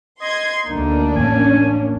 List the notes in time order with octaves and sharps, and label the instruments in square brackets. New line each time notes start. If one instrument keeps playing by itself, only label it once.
[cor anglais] D#5 [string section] C6 G#6
[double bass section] D2 [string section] A#3 D4 [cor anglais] D#4
[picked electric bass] A1 F2 [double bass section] C#4 [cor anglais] G#5